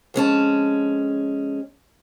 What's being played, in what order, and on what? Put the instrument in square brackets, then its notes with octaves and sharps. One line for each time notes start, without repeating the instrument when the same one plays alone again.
[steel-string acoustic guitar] F2 G#3 C#4 A5